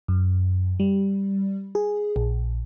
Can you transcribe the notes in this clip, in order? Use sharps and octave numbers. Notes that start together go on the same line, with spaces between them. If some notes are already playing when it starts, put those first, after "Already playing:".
F#2
G3
G#4
A#1